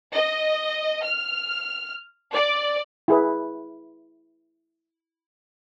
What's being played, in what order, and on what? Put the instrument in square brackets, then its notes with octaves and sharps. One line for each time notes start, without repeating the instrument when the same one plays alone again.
[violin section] D#5
F6
D5
[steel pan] E4 G#4 B4